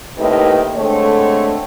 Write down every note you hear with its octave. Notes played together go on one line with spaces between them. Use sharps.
D#2 A2 C3 D#3 B4
D3 G#3 A3 C4 C#5